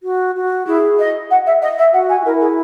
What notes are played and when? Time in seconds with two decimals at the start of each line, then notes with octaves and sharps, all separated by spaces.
0.03 F#4
0.35 F#4
0.67 E4 G#4
0.99 D#5
1.30 F#5
1.46 E5
1.62 D#5
1.78 E5
1.93 F#4 F#5
2.09 G#5
2.21 F#4
2.25 E4 A#4
2.41 G#4